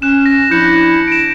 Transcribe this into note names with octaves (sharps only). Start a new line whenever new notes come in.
C#4 F#6 E7
A#6
F3 D4 E4 F#6 G6 C#7
D7 E7